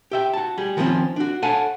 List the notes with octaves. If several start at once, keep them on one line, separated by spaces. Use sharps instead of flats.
G4 E5 G5
F#4 A5
G3 G#4
D#3 F3 G3 A3 C4 C#4
D4 F#4
A4 C#5 F5 F#5 G#5 A5